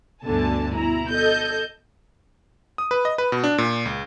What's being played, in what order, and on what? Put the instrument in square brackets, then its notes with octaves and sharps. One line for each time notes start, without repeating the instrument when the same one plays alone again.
[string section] D2 G2 B2 D3 G#5 A5
B2 E4 A#5
A4 D#5 G6
[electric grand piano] D#6
B4
D#5
B4
B2
D4
A#2
C#2